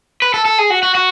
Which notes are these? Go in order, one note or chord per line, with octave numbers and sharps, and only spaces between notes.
B4
A4
A4
G#4
F#4
F#4
F#4